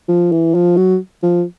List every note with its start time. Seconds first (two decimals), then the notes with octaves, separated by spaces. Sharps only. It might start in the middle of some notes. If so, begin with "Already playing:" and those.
0.08 F3
0.32 E3
0.54 F3
0.77 F#3
1.23 F3